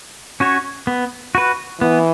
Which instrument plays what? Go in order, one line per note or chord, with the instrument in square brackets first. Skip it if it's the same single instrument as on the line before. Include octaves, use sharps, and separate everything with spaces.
[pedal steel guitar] C#4 F#4 C#5
B3
F#4 B4
[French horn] E3 [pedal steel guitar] B3